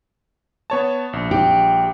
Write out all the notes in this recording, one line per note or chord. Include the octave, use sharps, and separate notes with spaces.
B3 C#5 A5
A#1
G4